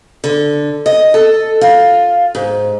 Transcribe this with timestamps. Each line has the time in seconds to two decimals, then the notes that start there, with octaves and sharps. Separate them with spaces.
0.24 D3
0.86 D#5
1.14 A4
1.61 F4
2.35 G#2